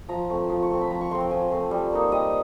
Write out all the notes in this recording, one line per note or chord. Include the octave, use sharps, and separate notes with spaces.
F3 A#5
A3 C4
F3
C#6
A3 C4 C6
B5
F3 A#5
C#6
A3 C4 C6
G5
F3 G#5
A3 C4
G3
A#3 D#4
G3 D#5